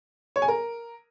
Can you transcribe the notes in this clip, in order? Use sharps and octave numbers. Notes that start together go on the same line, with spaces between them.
C#5
G#5
A#4